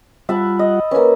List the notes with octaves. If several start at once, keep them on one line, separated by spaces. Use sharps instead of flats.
G3 F4 E5 F#5 A5 B5
D#5
A#3 C#4 A#4 B4